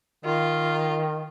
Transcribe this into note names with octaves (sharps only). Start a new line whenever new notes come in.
D#3 F4